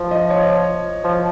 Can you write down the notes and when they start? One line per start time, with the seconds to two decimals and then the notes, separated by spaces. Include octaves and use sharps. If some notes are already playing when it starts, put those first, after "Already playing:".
Already playing: F3
0.11 D#5
0.30 C#5
1.04 F3